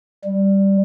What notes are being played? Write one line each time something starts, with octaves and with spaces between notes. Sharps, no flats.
G3